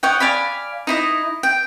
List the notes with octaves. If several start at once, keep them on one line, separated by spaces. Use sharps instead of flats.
C#5 D#5 F#5 G5
D5 F5 G#5 B5
D#4 E4 D#5
G5